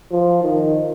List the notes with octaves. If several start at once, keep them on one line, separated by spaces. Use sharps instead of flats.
F3
D#3